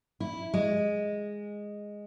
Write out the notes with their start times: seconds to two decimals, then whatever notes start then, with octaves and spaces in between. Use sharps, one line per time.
0.20 E4
0.54 G#3